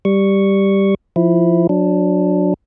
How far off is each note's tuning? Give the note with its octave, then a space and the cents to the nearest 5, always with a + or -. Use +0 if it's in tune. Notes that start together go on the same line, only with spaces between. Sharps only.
G3 +0 C#6 +0
F3 -10 E4 +0
F#3 -30 D4 +0